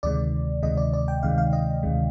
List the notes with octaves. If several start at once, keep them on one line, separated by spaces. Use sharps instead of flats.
D2 C3 D#3 G#3 D5
D2 C3 D#3 G#3 D#5
D5
D5
G5
D2 C3 D#3 G#3 F5
F5
D#5
D2 C3 D#3 G#3